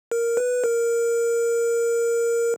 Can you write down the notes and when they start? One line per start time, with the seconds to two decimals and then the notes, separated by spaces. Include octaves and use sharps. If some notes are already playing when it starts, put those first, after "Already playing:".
0.11 A#4
0.37 B4
0.64 A#4